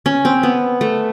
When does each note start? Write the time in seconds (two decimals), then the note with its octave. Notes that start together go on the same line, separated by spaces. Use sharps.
0.06 C#4
0.25 C4
0.43 B3
0.81 A3